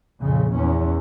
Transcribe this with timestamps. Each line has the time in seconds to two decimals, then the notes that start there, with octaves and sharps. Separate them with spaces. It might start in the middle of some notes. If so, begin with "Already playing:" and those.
0.21 A#1 F2 C#3
0.55 E2 C#4